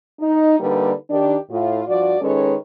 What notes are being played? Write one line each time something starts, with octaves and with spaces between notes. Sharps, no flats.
D#4
D3 G3 A#3 D#4 B4
D#3 D4 G4
A2 F4
G2 F3 F#4 D5
D#3 G#3 C#4 A4 B4 C#5